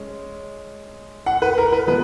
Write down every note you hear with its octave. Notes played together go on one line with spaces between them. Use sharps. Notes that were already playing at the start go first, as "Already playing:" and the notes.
Already playing: G#3 C#4
F#5
B4
A#4
B4
F3 G#3 B3 B4